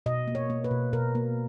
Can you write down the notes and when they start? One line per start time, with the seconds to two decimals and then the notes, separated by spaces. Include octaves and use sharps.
0.06 B2 D#5
0.28 A#3
0.35 C#5
0.50 A#3
0.64 B4
0.71 B2
0.93 B2 A#4
1.15 A#3